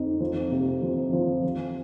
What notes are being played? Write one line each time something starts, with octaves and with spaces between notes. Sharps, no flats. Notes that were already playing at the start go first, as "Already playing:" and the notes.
Already playing: F2 D#4
F3
C3
F3
F3
F3